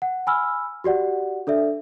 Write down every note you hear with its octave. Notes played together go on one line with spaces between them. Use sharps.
F#5
G#5 B5 E6 F6
F#4 G4 D5 F#5
D4 A4 D5 E5